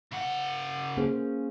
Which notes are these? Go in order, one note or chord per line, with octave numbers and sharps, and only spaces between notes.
C#3 F#5
A#3 C#4 G#4 C5